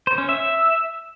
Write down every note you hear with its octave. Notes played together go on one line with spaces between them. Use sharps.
C5
C#4
E5